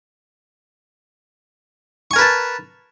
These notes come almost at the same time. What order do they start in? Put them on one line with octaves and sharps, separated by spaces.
C#6 G#5 A#4 B4 A5